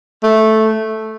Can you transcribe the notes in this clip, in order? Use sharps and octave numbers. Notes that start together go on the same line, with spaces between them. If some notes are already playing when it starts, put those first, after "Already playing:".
A3